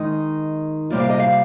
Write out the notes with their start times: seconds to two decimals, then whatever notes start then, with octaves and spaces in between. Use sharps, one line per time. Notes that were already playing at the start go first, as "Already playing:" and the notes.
Already playing: D#3 G#3 D#4
0.90 C3 G3 A#3 F4
1.00 F5
1.10 D#5
1.20 F5